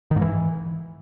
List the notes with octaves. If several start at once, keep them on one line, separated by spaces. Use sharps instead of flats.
D#3
G#2
E3